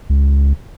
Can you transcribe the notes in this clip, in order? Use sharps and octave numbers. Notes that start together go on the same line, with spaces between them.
C#2